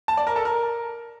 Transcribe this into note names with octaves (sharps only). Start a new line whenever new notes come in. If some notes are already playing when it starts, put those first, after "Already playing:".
A5
D5
A#4
A4
A#4